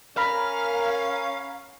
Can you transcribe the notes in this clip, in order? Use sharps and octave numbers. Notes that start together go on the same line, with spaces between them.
C#4 A#4 F5 A#5 B5 F6